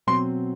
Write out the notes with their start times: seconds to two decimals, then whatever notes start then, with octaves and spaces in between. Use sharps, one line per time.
0.07 B2 F#3 C4 C6